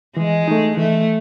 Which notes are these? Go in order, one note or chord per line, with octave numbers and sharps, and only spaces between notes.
E3 G#3
A3 D#4
E3 A3